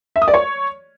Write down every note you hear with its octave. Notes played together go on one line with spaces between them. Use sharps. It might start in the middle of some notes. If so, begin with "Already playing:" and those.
E5
D#6
D5
C#5